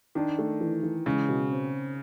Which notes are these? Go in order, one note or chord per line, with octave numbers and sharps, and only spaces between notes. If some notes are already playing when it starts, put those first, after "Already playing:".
D#3 D4
A3
E3
E3
C#3 G#3
B2
C4